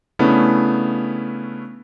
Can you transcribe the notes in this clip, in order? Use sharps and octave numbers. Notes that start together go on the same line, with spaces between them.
C#3 A3 B3 C#4 D4 E4